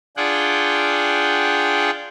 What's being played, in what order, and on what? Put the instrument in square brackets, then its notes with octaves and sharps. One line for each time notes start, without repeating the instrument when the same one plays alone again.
[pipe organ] D4 F4 G#4 F#5 G5